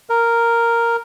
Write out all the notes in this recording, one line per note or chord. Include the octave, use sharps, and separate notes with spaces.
A#4